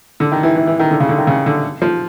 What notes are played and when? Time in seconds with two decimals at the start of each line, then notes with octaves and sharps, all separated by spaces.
0.20 D3
0.32 D#3
0.43 E3
0.56 E3
0.67 E3
0.79 D#3
0.91 D3
1.00 C#3
1.09 D3
1.18 D#3
1.27 C#3
1.46 D3
1.82 F3